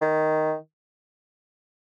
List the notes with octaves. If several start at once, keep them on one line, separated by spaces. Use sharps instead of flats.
D#3